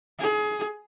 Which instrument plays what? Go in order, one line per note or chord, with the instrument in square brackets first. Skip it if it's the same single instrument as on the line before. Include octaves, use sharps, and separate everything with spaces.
[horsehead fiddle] G#4